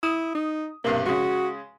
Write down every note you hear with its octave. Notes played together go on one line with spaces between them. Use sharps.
E4 D#6
D#4
B1 G2 C3 A#3
C#3 G#3 F#4